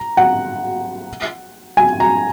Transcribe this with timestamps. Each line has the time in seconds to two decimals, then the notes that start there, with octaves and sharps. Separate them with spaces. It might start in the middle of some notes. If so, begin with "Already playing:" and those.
Already playing: A#5
0.17 F#5
1.77 G#5
2.00 A#5